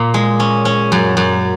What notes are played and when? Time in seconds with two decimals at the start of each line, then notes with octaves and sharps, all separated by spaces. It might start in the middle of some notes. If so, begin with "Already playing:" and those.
Already playing: A#2 A#3
0.14 G#3
0.40 C#4
0.65 C#4
0.92 F#2
1.17 F#2